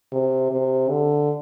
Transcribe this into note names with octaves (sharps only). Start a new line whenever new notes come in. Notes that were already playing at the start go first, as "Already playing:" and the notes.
C3
C3
D3